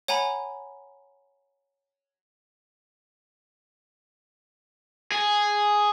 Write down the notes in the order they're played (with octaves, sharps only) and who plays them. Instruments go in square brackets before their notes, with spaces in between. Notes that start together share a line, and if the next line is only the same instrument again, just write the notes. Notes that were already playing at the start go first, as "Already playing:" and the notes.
[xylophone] C#5 F#5 G#5 A#5 B5
[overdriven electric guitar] G#4